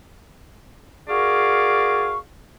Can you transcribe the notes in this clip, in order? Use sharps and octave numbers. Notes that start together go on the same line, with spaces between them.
F#4 G#4 A#4 D5 F5 C#6